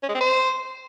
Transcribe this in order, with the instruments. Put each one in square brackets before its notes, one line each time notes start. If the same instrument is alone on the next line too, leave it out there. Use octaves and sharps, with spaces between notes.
[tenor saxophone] C#4
G#3
C4
C5